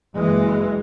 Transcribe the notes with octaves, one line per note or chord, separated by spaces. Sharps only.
F#1 E3 G#3